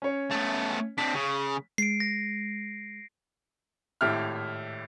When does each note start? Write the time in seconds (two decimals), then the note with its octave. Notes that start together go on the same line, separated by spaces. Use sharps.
0.02 C#4 C#5
0.31 A3 B3
0.98 C4 D4 B6
1.15 C#3
1.78 G#3 C7 D7
2.00 A#6
4.01 G#1 A2 G4 E5 F6